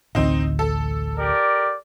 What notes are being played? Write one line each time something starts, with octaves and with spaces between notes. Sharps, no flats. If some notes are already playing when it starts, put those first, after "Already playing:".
A1 D2 C4 D#4
A4
G4 A#4 D5